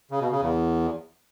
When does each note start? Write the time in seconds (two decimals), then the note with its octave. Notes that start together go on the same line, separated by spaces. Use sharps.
0.11 C#3
0.21 B2
0.31 C#3
0.41 E2